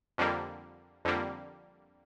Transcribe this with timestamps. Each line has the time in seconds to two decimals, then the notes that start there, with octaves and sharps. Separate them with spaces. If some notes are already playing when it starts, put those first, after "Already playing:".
0.18 F2 D3 G3 A#3
1.05 F2 D3 G3 A#3